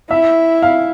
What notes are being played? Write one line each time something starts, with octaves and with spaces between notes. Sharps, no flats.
E4 E5
F5